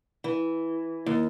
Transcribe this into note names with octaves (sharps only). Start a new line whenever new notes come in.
E3
D#2